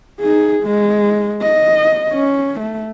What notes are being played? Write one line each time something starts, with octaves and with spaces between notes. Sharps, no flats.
D#4 G#4
G#3
D#5
C#4
A3